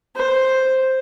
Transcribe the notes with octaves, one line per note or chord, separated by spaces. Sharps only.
C5